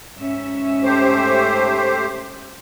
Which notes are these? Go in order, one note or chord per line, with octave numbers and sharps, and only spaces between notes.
G#2 C#4 E5
A3 G4 C5